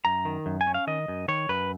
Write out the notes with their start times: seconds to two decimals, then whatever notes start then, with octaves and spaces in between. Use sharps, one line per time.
0.05 F#2 A#5
0.25 D#3
0.46 F#2
0.61 G#5
0.67 C#4
0.74 F5
0.87 D#3 D#5
1.08 F#2
1.28 D#3 C#5
1.49 F#2 B4